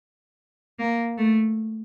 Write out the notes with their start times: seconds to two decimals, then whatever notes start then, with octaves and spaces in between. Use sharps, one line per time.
0.79 A#3
1.18 A3